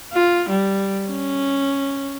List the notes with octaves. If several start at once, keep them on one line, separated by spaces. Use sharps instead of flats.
F4
G3
C#4